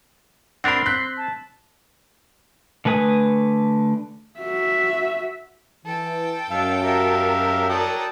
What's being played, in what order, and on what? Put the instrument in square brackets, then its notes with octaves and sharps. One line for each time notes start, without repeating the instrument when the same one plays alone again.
[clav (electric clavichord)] C4 D4 A#4 [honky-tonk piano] F#5 B5 [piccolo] C6
[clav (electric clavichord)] C4 [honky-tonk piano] F#6 B6
[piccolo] A5
[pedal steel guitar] D3 A3 B4 G#5 D#6
[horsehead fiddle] F#4 E5
[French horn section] E3 [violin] A4 G5
[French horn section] F#2 [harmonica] F5 E6 [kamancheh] A5
[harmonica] G4 E5 F5 [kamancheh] A#4
[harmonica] F#3 G5 D#6 [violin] A4 D5